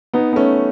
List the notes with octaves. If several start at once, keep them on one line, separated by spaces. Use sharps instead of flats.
B3 D#4
B3
A3 C#4